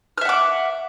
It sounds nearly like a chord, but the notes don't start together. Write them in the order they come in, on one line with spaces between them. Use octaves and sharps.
F6 E5 F#5 D6